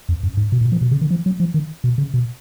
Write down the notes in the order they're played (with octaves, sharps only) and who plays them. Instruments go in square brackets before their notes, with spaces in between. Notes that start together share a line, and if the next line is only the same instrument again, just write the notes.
[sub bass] F2
F#2
G#2
B2
A#2
F3
B2
C#3
D#3
F3
F#3
F3
D#3
B2
C#3
B2